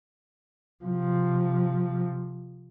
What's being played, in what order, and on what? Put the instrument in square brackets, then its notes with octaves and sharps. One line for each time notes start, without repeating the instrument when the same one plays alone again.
[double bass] C3 F3